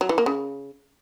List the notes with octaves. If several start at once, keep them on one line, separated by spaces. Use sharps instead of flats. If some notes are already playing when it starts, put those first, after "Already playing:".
F#3
E3
A#3
C#3